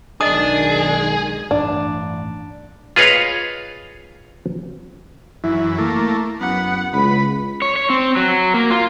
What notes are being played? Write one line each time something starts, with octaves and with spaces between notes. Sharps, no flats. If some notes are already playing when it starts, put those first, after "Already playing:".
B1 D#3 G#3 D4 G#4 D#5 D#6
A1 G2 D4
F4 G#4 B4 C#5 D#5 F5
F#2 E3 E4
A3 A#3
F#2 B3 F#5
C#2 B4 B5
C#5
C#5
C4
F#3
A#3
F4